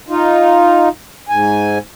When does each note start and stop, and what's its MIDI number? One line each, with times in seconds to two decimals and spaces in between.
0.09 0.89 63
0.09 0.89 65
1.29 1.78 44
1.29 1.78 80